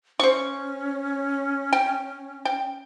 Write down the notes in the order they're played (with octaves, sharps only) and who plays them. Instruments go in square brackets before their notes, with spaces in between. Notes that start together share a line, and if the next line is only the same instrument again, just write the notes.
[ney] C#4 [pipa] C5 C#6
[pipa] G5
G5